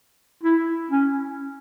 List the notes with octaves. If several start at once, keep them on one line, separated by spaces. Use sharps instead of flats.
E4
C#4